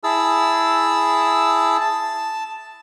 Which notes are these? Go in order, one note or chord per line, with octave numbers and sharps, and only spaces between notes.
E4 G#4 A5 E6
A5